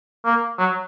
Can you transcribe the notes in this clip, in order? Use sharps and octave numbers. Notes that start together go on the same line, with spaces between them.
A#3
F#3